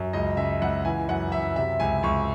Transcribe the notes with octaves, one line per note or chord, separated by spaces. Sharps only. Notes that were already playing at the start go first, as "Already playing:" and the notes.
Already playing: F#2
C#2 D#5
C#3 E5
C#2 F#5
E3 G#5
F#2 F#5
F#2 E5
C3 E5
C#2 G#5
C#2 C#6